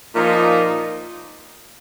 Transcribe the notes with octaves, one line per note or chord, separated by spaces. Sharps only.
A#2 F3 A#3 D#4